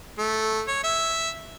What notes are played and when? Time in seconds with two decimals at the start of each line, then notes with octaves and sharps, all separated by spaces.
0.18 A3
0.68 C#5
0.84 E5